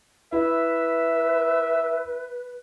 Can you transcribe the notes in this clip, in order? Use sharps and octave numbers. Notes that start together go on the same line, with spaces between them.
E4 B4 E5